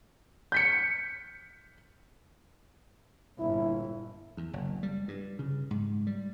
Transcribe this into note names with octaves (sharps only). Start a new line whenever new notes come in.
G6 B6 C#7
G1 A#2 E4
E2
F#1
G3
G2
C#3
G#2
G3